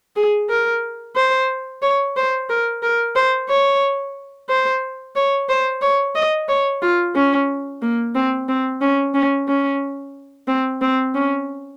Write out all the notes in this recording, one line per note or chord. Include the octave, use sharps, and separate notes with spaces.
G#4
A#4
C5
C#5
C5
A#4
A#4
C5
C#5
C5
C#5
C5
C#5
D#5
C#5
F4
C#4
A#3
C4
C4
C#4
C#4
C#4
C4
C4
C#4